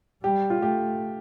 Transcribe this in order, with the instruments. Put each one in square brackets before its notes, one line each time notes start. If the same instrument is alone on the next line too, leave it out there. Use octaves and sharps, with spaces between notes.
[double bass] G3 [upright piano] G4
[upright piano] F4
[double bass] A3 [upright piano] G4